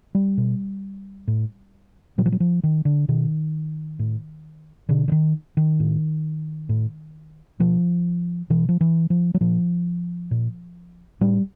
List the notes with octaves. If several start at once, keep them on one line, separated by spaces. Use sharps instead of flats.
G3
B2
A2
A#2 F#3
F3
F#3
F3
D#3
D3
B2 D#3
A2
B2 D3
D3
D#3
D#3
A2
A2
B2 F3
B2 E3
F3
E3
F3
F#3
A#2 F3
A#2
A2 G3